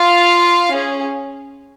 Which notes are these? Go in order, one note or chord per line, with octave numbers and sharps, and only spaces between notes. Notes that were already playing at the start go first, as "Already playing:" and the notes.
Already playing: F4 F5
C#4 G#4